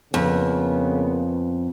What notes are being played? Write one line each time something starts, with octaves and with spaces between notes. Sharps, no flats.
F2 C#3 A#3 B3